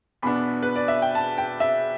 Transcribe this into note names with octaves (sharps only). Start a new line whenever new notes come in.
E2 B2 B3 D4 B5
B4
D5
E5
G5
A5
G5
E5